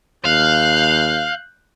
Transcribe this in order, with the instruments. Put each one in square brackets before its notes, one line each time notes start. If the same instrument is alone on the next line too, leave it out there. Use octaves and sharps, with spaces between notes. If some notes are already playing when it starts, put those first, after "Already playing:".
[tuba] D#2 [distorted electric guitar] F5 [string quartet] F#6 G6